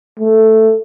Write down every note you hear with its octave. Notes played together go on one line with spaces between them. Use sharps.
A3